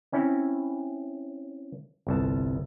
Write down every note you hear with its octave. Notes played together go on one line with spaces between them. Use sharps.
C4 C#4 E4
G1 C2 A5